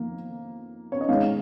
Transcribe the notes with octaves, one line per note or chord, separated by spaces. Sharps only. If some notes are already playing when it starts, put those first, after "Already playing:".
Already playing: F2 D#3 A#3
C#5
D#5
G#2 D#3 G#3 F5